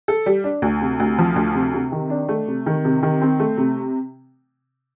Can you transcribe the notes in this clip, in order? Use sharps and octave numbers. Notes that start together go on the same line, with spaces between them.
A4
G3
D4
D2
C3
D2
F3
D2
C3
C3
D#3
D4
A3
C3
D#3
C3
D#3
C4
A3
C3